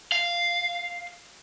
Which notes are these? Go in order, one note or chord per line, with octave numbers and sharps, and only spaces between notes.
F5